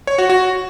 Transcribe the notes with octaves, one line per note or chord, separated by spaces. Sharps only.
C#5
F#4
F#4